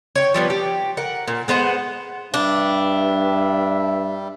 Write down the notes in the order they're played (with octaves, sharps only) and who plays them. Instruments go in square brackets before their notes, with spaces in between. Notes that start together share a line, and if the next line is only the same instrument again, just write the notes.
[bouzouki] C#5 G5
F3 G3 B3
G4
A#4 F#5
A#2
G#3 B3 C5 F#5
[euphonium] G2 [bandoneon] G3 [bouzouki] D4 [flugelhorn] E5